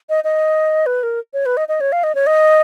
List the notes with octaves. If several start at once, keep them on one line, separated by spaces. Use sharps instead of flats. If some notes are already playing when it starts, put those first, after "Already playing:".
D#5
D#5
B4
A#4
C#5
B4
D#5
D#5
C#5
F5
D#5
C#5
D#5